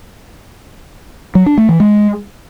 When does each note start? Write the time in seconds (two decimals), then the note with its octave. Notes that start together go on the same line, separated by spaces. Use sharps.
1.35 F#3
1.46 D4
1.58 A3
1.69 E3
1.80 G#3